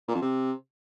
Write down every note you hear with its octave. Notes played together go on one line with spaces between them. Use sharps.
A#2
F2
C3